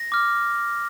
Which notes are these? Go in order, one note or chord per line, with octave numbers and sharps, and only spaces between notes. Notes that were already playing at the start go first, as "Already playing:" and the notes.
Already playing: A#6
D6 F6